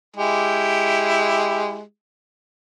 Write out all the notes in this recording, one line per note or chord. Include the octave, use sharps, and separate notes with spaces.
G#3 E4 G4